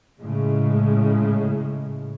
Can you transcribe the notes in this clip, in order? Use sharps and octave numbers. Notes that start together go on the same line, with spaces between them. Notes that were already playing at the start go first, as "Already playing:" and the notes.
A2 C#3 G#3